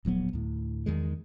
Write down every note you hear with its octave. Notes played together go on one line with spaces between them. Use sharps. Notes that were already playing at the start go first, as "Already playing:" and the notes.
D1 A#1 F#3 B3
D2 A2
E2 D#3 G#3